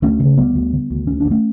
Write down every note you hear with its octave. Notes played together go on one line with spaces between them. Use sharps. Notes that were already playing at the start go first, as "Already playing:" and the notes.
D2 A3 C#4
C#3
D2 G3 B3
D2
D3
D2
D2 C#4
D2 D4
A3 C#4